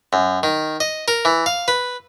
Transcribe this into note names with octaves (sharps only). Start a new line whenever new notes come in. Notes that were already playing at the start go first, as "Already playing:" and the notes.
F#2
D#3
D#5
A#4
E3
F5
B4